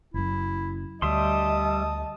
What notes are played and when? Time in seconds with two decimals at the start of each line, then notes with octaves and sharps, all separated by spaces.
0.14 F#1 F#2 E4
1.02 D2 G3 D#5 E5 A5 C6 D#6